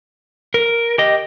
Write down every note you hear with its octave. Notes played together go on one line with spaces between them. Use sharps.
A#4
G4 D#5